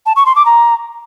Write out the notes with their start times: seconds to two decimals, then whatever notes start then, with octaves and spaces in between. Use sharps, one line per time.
0.06 A5
0.16 C#6
0.26 C6
0.36 D6
0.46 A#5